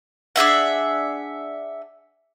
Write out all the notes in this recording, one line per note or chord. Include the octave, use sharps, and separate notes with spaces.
D4 G#4 E5 F#5